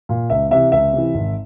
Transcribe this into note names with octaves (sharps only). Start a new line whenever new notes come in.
A#2
C#2 E5
C3 E3 E5
C#2 E5
C3 E3
G#1